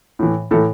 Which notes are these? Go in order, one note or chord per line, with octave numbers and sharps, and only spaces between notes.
A2 E3
A2 E3 A4